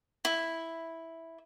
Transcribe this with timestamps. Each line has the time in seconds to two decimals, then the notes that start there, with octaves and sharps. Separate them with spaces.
0.25 E4